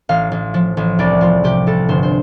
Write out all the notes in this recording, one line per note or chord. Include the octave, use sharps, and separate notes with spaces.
A1 F5
A1
F3
A1
C2 D5
F3 F4
C3 G4
C2 A4
G1 C5
C5